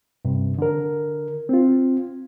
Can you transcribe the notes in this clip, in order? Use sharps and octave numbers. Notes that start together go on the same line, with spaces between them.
G2 C3
D3 A#4
C4 F4